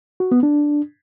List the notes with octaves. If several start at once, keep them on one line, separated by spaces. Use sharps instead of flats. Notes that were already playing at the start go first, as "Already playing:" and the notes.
F#4
B3
D4